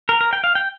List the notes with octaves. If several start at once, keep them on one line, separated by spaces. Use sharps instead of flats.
A#4
A#4
G5
F5
G5